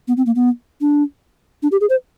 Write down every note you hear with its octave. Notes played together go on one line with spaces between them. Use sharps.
B3
C4
A#3
B3
D4
D4
G4
G#4
C5